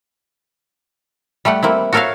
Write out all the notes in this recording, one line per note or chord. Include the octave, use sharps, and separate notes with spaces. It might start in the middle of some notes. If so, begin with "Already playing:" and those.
G3 A3 G4 F#5
A#3 C4 E4
F#4 A4 A#4 C#5 E5 F5